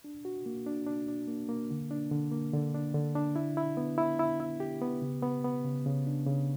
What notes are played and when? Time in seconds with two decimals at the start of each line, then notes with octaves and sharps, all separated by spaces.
0.04 D4
0.25 F#4
0.46 A#3
0.66 D4
0.86 D4
1.08 D4
1.28 A#3
1.49 A#3
1.70 D3
1.91 D4
2.11 D3
2.32 A#3
2.53 D3
2.74 D4
2.94 D3
3.15 D4
3.36 E4
3.57 E4
3.77 B3
3.98 E4
4.19 E4
4.40 E4
4.60 G4
4.82 B3
5.02 C#3
5.23 B3
5.44 B3
5.64 C#3
5.86 C#3
6.07 D4
6.26 C#3